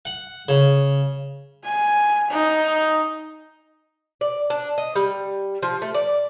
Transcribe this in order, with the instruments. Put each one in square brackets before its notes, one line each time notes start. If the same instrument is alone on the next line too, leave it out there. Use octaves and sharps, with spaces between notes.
[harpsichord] F#5
C#3
[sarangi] G#5
D#4
[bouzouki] D5
D4
D#5
G3
F3
A3
D5